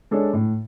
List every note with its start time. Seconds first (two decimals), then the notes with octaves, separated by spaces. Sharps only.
0.11 G#3 D4 A4 C#5
0.33 A2